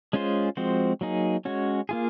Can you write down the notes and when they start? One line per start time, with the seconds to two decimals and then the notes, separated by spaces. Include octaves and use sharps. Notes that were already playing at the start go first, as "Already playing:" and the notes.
0.13 G#3 C#4 F4 G#4 C5
0.57 F3 G#3 C4 F#4 C5
1.01 F#3 A#3 D#4 G#4
1.45 G#3 C#4 F#4 C#5
1.89 A#3 F4 G#4